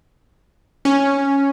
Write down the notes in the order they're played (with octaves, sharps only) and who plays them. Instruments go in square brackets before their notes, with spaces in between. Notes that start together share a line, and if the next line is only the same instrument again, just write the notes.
[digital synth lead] C#4